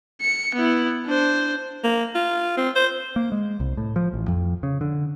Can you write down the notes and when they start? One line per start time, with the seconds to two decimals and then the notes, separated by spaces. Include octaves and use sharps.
0.21 C#7
0.55 B3 E4
1.06 D4 C5
1.84 A#3
2.15 F4
2.57 C4
2.76 C5
3.16 A#3
3.32 G#3
3.60 C2
3.77 A2
3.96 F3
4.14 A1
4.28 F2
4.63 C#3
4.81 D3